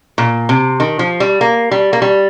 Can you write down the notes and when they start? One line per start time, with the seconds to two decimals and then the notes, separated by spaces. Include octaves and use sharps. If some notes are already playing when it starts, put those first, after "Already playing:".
0.18 A#2
0.49 C3
0.80 D#3
0.99 F3
1.20 G3
1.41 A#3
1.71 G3
1.93 A#3
2.02 G3